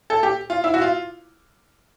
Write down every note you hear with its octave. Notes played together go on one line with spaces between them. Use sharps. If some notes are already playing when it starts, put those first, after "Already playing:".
A4
G4
F4
E4
F#4
F4